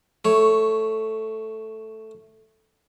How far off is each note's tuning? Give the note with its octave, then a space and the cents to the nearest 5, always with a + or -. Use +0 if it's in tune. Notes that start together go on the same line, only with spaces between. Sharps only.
A3 +0 C#5 +0